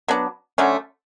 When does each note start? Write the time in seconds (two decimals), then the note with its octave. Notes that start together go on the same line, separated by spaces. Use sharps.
0.08 F#3 B3 D4
0.58 D3 F#3 A3 C#4